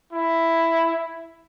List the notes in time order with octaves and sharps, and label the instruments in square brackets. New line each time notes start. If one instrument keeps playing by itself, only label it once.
[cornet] E4